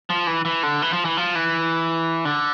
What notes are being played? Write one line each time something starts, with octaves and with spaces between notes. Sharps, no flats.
F3
E3
E3
D3
E3
F3
E3
F3
E3
D3